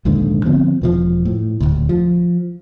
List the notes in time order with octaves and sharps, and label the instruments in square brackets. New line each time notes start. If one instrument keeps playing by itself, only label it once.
[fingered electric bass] A#1 D#2 G#2 D3
D3 F3 B3 C4
E1 A2 F3
A2
D#1 G#1 D2
F3